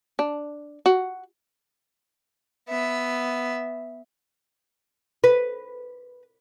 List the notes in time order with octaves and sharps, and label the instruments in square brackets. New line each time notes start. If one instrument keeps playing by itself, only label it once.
[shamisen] D4
F#4
[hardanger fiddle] B3 E5
[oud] B4